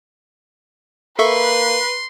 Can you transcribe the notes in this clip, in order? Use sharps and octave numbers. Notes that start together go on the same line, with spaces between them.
A#3 A4 B4 E5 C6 C#6